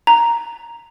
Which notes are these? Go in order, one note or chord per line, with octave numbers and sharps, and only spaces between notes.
A#5